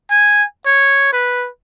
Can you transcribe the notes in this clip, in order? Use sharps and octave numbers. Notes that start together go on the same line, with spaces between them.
G#5
C#5
B4